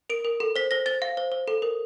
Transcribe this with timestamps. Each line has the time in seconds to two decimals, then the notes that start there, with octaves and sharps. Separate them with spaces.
0.10 A#4 D7
0.25 A#4
0.40 A4
0.56 C5 B6
0.71 C5 A#6
0.86 C5 A6
1.02 F5
1.17 C5
1.32 C5
1.48 A4
1.62 A#4